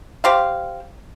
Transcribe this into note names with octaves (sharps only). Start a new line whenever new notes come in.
G4 C5 F5